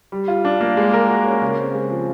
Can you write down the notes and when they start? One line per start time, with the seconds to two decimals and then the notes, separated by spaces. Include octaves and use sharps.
0.12 G3
0.28 F4
0.45 D4
0.61 A#3
0.77 G#3
0.94 A#4
1.09 F#4
1.25 C#4
1.42 C#3
1.58 C4
1.74 G#3
1.90 F3